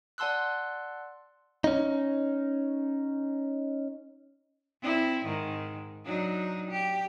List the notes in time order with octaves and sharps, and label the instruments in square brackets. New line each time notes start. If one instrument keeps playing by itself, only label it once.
[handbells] D5 F#5 A5 C6 E6 F#6
[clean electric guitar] C#4 D#4
[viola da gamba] C4 E4
G#2 D#3
F#3 D4 D#4
G4